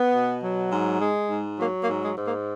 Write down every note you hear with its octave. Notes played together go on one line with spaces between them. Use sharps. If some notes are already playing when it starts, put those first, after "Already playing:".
Already playing: B3
B2
F#3
G#2
G#3
G#2
F#3 A#3
A#3
G#2
G#3
G#2
A#3